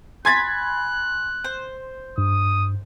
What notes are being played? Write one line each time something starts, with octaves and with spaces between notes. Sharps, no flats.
G#5 B5 C6 F#6 G#6 A6
C5
G2 D#6